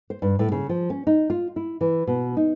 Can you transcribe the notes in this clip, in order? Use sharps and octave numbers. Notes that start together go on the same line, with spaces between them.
C5
G2
A2
C#3
F3
C#4
D#4
F4
E4
E3
B2
D#4